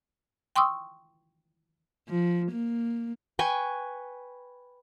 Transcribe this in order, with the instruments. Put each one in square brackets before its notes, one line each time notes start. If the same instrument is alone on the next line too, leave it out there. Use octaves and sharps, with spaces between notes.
[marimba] G5 C6 C#6 D#6 E6
[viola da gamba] F3
A#3
[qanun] B4 G5 G#5 C#6